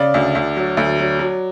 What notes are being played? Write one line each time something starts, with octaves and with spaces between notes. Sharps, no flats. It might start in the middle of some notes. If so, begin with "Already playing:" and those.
Already playing: C#3 D5
D2
D2
F#3
D2
F#3
F#3